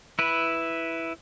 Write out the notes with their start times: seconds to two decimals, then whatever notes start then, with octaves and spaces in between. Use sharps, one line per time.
0.19 E4 B4